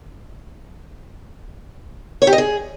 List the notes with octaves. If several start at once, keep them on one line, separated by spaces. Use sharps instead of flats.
C#5
G4
D#5
G#4